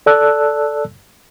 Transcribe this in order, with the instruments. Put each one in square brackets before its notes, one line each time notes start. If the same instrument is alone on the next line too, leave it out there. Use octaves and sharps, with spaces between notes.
[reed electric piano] A4 D5 A5 E6 F#6